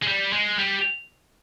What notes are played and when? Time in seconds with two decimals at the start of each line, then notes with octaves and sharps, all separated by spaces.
0.02 G#3
0.07 G3
0.33 G#3
0.59 G3